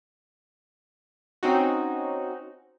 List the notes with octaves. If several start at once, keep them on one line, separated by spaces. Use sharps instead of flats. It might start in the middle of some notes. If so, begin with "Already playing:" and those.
C4 C#4 D#4 F#4